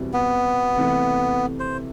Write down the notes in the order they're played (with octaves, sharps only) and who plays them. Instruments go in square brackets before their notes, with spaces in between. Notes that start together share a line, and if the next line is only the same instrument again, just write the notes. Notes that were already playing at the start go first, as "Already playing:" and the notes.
Already playing: [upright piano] E2 B2 G3 C4 E4
[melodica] B3
[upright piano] C3 E3 A3 E4
[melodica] C5